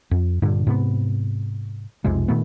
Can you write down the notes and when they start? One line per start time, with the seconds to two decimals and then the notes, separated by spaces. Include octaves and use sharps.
0.11 F2
0.42 G2 A#2 D3
0.67 G#2 C3 B3
2.04 B1 F2 C3 G#3
2.28 A#2 D#3 A3 B3